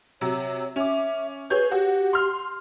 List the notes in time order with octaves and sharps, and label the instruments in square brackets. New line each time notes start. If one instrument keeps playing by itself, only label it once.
[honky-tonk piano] C3 F#3 [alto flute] C#5
[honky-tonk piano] C#4 D6 [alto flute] E5
[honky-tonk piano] G#4 C#5 G6 [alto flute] B4
[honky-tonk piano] F#4 [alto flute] G4
[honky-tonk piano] C6 F6